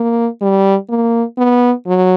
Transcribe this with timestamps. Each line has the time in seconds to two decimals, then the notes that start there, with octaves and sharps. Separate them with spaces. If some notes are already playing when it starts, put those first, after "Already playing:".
Already playing: A#3
0.42 G3
0.89 A#3
1.38 B3
1.87 F#3